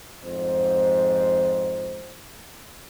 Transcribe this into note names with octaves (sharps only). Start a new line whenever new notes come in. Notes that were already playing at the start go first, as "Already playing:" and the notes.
F2 G#2 C5